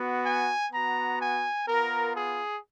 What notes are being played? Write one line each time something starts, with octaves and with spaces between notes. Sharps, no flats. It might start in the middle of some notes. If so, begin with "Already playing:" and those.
Already playing: B3 F#4
G#5
B3 F#4 A#5
G#5
B3 F4 A#4
G#4